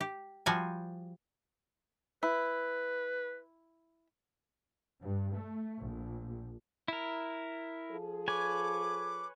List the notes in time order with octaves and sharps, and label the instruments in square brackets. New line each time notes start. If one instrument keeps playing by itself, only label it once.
[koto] G4
F3 G3 F#4 C5 F5 G#5
[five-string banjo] E4 [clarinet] B4
[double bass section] G2
A3
A#1
[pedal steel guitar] E4 A#4
[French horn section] F3 G#4 A4
[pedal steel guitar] B4 C#5 G#5 [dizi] D6